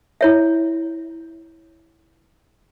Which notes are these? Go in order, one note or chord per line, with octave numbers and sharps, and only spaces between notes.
E4 C#5 E5